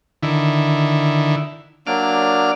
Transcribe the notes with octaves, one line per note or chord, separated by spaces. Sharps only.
D3 D#3 E4
F#3 A#3 D4 D5 F6